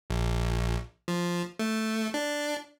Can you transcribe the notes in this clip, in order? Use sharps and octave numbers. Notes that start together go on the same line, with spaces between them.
A#1
F3
A3
D4